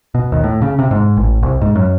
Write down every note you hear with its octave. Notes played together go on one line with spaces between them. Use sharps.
B2
D#2
A2
C#3
C3
G#2
A1
C2
G#2
F#2